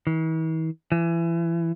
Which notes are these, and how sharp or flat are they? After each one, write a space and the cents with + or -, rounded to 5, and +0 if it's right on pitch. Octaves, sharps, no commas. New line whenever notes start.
E3 -45
E3 +25